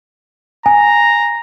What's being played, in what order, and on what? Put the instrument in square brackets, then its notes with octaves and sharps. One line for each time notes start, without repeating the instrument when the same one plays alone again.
[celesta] G#5 [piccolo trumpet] A#5